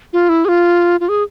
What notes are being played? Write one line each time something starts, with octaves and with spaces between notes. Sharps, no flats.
F4
E4
G#4
F4
F4
G#4